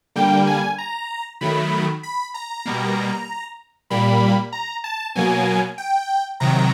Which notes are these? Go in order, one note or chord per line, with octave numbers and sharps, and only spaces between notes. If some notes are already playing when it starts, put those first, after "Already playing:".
D3 G3 A#3 G5
G#5
A#5
D#3 F#3 A3 B5
B5
A#5
B2 G3 A#3
A#2 G3 A#3 B5
A#5
A5
B2 F#3 A#3 G#5
G5
C3 D#3 F#3 A#5